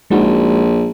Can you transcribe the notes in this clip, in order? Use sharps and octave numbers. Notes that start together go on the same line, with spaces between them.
A#1 G#3 D#4 F#4